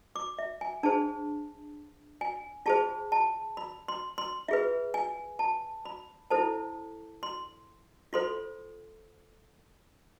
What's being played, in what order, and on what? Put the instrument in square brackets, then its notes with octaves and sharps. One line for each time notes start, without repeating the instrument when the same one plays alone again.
[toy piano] D6
E5
G#5
D4 G#4 C5 A5
G#5
F4 G#4 C5 A5
A5
B5
C6
C6
F4 G#4 B4 E5
G#5
A5
B5
E4 A4 C5 A5
C6
F4 A4 C5 C6